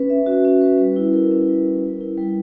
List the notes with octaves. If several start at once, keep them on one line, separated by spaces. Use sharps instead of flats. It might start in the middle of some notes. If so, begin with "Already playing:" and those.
Already playing: C#4 B4
E5
F#4
C#4
B4
G3
E4
A#4
C#4
G3
E4
G3
E4
G3